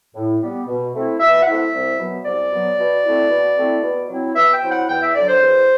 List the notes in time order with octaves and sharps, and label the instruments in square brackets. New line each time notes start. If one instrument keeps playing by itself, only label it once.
[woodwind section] A2
G3 B3
B2
A3 C4 E4
B2 E5
F#5
A3 C4 E4 E5
C2
B2 F#3 B3
C2 D5
B2 F#3 B3
B2
A3 C4 E4
B2
A3 C4 E4
B2
F#3 C4 E4
B2 E5
G5
F#3 C4 E4
F#5
E2 G5
E5
D3 F#3 D5
C5
E2